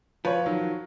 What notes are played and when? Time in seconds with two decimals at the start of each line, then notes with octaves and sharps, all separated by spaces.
0.25 F3 B4 C#5
0.46 D#3 F#3